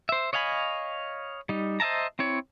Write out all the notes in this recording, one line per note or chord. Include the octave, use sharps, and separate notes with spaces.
C5 E5
C#5 D#5 F5 G#5 B5
G3 D#4
C5 D#5 E5 A5 A#5
C4 E4 C#5